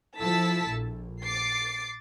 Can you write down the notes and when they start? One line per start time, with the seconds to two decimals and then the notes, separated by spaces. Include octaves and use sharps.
0.18 F3 E4 A4 A5 E6 B6
0.67 A#1
1.24 D6 A6 C7